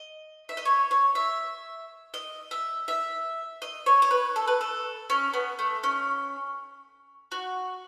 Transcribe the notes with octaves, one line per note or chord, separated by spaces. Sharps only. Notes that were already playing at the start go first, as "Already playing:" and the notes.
Already playing: D#5
E5
D#5
C#5
C#5
E5
D#5
E5
E5
D#5
C#5
C#5
B4
A4
B4
A4
C#4
B3
A3
C#4
F#4